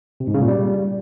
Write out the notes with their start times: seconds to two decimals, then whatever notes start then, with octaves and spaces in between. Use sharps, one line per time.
0.20 C3
0.27 G#2
0.34 C#3
0.41 A#2
0.48 G3